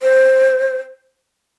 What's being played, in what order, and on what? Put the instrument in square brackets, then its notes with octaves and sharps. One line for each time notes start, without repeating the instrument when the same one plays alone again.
[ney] C5